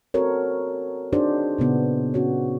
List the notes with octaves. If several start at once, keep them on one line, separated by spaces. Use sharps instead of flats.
C4 F#4 A4 A#4 C5 C#5
D4 D#4 F#4 G#4 C5 D5
A#2 C#3 B3
C#4 F#4 C#5